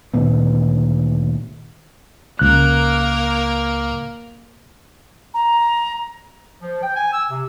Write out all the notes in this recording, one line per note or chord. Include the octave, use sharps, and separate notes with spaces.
D2 A#2 D#3 B3
C#2 A#3 A#4 F#6
A#5
F3
G5
G#5
E6
C3